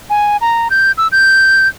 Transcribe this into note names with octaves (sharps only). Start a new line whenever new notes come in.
G#5
A#5
G6
E6
G6